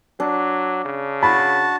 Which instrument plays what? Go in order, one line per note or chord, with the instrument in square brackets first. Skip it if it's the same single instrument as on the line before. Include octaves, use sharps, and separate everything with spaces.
[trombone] F#3 [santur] D4
[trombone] C#3
[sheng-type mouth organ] F#4 A5 [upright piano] B5